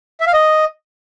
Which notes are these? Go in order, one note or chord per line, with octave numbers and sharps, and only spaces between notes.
E5
F5
D#5